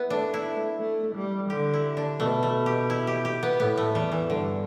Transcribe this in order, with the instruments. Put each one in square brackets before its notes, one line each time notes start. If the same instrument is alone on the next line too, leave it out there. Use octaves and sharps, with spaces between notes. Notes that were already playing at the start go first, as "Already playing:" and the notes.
Already playing: [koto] B3 E4
[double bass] A3 [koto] D4
[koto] E4
[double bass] A3
G3
[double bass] D3 [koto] G4
[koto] E4
D4
[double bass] B2 [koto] A3
[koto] A3
G4
E4
G4
G4
B3
[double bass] A2 [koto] B3
[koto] A3
[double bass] E2 [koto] G3
[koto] E3
[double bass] G2 [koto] D3